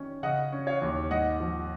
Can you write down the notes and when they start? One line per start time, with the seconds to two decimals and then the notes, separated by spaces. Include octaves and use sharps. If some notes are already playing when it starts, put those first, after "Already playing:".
Already playing: D#3 C#4
0.23 C#3 D#5 F#5
0.52 C#4
0.67 C#5 F5
0.82 D#2
1.11 G#2 D#5 F#5
1.40 F3